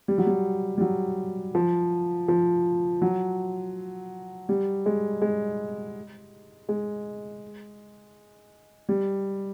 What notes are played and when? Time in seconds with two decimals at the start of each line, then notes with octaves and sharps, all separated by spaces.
0.08 G3
0.18 F#3
0.27 G3
0.78 G3
0.81 F#3
1.55 F3
2.28 F3
3.02 F#3
4.49 G3
4.86 G#3
5.22 G#3
6.69 G#3
8.89 G3